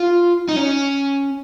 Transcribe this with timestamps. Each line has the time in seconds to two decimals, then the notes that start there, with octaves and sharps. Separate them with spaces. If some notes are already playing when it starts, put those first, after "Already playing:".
Already playing: F4
0.49 D#4
0.56 C#4